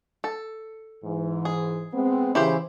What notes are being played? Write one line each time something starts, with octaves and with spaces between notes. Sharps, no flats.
A4
G#2 E3
G#4
G#3 B3 C4
C#3 E3 E4 G4 C5